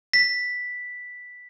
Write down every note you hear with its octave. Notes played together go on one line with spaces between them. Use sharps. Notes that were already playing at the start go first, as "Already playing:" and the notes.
B6